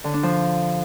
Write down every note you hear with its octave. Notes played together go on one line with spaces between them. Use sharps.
D3
D4
F3